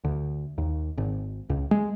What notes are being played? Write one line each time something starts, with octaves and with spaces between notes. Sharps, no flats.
D2
D#2
G#1
C#2
G#3